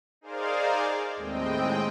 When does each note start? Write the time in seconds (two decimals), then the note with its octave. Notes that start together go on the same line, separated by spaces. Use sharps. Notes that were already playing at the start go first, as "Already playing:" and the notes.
0.21 D#4 G#4 A#4 C5 D5 F5
1.15 D#2 A2 G#3 C4 D#5 G5